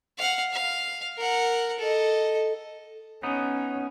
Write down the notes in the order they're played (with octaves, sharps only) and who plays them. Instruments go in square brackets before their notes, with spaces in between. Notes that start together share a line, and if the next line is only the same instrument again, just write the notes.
[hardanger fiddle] F5 F#5
F5
A#4 F#5
A4 D#5
[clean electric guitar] B3 D#4 [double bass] C#4